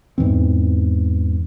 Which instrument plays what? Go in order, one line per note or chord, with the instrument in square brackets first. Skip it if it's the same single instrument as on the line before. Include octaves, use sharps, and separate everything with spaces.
[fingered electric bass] E2 G#2 E3 C4